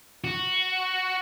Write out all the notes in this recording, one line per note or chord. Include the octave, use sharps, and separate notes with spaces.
F#4